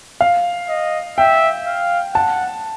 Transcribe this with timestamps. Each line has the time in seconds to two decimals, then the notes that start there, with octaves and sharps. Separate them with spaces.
0.21 F5
0.69 D#5
1.18 E5 G5
1.66 F5
2.14 F#5 A5